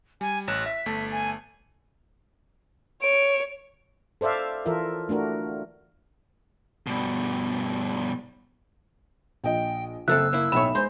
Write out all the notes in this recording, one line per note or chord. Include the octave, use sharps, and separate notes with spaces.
G3 G#5
A1 C#5 F#6 E7
E5 B6
G1 A3 A5
G#5
C#5 D7
A4 C5 D5 E5 F5
E3 F4 A4 A#4 E5
A3 D4 F#4 A#4
G2 B2
A#1 D#5 G5
F#1 C4 A4 E5 E6 F#6
A#3 E4
B1 A2 C#5 E5 B5 E7
G#3 C5 C6 G6